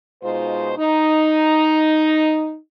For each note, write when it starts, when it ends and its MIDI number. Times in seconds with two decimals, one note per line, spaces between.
0.23 0.73 47
0.23 0.73 56
0.23 0.73 63
0.23 0.73 65
0.23 0.73 72
0.78 2.56 63